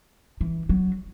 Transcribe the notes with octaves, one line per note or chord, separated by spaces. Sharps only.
E3
F#3